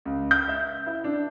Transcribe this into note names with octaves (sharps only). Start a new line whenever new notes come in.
C#2
G6
E5
E4
D4